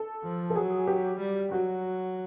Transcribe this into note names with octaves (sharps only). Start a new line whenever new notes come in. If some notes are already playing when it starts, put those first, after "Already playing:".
Already playing: A4
F3
A4
F#3 G#4
G4
G3
F#3 F#4